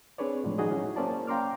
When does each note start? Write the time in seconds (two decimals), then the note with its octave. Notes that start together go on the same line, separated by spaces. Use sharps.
0.18 C4 D4 G#4 B4 C#5 D5
0.44 A2 D#3 F3 F#3 G#3 A3
0.58 C#4 D#4 F#4 G#4 D#5
0.71 F#3 C#4 E4
0.96 A#3 C#4 C5 D5 A5
1.27 F5 G5 A#5 C6 D6 F6